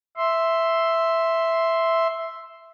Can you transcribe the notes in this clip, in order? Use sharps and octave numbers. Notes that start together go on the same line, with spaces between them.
E5 C6